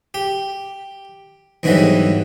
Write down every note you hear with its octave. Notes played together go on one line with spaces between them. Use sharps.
G4
E2 G#2 D3 E3 F#3 G3